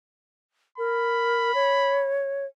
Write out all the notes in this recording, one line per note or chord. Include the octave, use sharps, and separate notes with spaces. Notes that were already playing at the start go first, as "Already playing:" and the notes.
A#4 B5
C#5